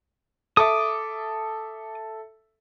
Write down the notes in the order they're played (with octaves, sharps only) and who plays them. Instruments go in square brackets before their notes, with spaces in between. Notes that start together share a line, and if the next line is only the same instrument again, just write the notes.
[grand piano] A4 E5 [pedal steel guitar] D6 D#6